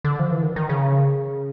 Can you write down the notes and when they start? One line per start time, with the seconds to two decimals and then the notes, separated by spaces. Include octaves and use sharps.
0.04 D3
0.20 F3
0.31 E3
0.43 D#3
0.56 D#3
0.69 C#3